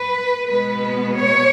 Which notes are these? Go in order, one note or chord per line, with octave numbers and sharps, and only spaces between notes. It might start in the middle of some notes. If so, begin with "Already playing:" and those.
Already playing: B4
B2 G#3 B3 B4
C#5